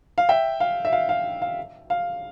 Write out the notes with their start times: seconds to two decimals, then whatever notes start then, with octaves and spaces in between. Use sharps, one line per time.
0.18 F5
0.29 E5 G5
0.60 F5
0.85 E5
0.93 F5
1.09 F5
1.42 F5
1.90 F5